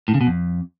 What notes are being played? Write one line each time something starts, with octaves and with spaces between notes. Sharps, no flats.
A2
C#3
B2
F2